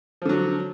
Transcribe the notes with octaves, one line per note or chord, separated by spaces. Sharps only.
D3 F3 F#3